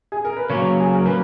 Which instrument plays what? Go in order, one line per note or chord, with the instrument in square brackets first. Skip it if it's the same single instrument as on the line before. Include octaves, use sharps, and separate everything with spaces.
[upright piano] G#4
A#4
B4
[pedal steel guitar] C#3 F#3 A#3 [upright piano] C#5
[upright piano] G#4
A#4
[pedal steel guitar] C#3 F#3 A#3 [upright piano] B4